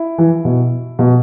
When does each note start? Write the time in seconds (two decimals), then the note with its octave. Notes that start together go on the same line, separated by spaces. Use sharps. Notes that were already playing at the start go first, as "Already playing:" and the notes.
Already playing: E4
0.18 E3
0.45 B2
0.99 B2